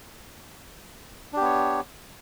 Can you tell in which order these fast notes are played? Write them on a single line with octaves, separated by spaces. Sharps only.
D4 G4 B3 C#5